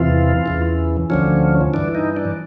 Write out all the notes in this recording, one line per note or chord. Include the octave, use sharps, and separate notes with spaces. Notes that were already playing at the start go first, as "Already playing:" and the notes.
Already playing: E2 C3 E3 F4
E2 C#3 E3
D2 D3 F3 C#4
G2 E3 D4
D#4
D4